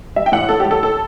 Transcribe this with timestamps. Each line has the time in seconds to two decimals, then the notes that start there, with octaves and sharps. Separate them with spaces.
0.16 G3 E5
0.26 G5
0.32 A2 F#5
0.49 A2 A4
0.60 G4
0.65 G3
0.71 A4
0.83 A4